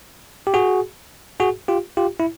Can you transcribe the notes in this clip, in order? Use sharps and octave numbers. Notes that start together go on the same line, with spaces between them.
G4
F#4 G#4
F#4 G#4
F4 G4
F4 G4
E4